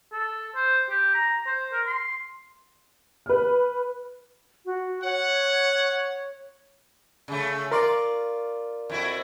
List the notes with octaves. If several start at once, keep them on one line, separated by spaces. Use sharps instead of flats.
A4
C5
G4
A#5
C5
A#4
C6
B4 F6
F#4
C#5 F#5
C#3 A3
F4 A#4 D5 C6 D6
F2 E4 F#4